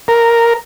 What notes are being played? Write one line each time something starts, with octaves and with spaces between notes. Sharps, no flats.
A#4